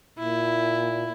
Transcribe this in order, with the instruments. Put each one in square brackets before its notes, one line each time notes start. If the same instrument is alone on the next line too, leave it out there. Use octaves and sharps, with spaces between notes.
[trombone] A#2 [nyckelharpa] E4